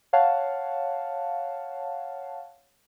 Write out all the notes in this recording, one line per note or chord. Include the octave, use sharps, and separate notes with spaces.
C#5 F5 F#5 A5